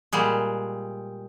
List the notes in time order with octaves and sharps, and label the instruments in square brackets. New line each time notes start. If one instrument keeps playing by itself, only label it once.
[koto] A#2 G3 G#3